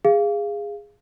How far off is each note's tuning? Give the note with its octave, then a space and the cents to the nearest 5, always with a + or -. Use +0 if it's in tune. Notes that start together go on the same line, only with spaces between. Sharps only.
G#4 -15 F5 -15